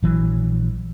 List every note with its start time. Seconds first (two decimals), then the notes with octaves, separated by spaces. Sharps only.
0.03 A#1 E3 F#3